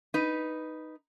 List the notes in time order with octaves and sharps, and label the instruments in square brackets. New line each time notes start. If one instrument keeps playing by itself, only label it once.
[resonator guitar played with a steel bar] D#4 B4